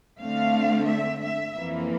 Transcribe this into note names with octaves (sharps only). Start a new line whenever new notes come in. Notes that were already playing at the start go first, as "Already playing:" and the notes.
D3 A3 C4 F5
E5
E5
F2 E3 A#3